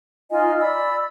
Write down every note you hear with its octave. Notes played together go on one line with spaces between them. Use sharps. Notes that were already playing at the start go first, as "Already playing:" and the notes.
D#4 F4 D#5 G#5
D5 B5 E6